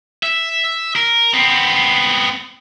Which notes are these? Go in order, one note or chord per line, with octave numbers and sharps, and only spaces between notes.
E5
A#4
B3 C4